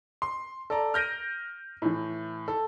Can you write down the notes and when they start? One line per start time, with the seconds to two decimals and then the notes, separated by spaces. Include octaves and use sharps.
0.22 C6
0.70 A4 D5 A#5
0.94 F6 G6 A#6 D7 D#7
1.82 A2 E3
2.48 A4